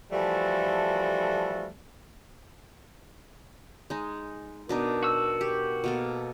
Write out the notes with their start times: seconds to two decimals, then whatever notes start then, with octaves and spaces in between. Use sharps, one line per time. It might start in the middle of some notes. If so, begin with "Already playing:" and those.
0.11 E3 F3 G3 A3 F#4 A4
3.90 G#3 D#4
4.69 B2 D4 D#4 A#4
5.03 F#4 E6
5.41 G4
5.84 B2 A#3 A4